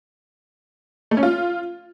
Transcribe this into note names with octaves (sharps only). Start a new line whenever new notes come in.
A3
C#4
F4